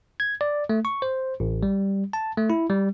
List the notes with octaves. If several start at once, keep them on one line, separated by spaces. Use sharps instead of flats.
G#6
D5
A3
C#6
C5
A1
G3
A5
A3
E4
G3